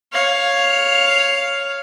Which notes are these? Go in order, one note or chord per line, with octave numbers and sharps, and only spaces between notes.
C#5 F5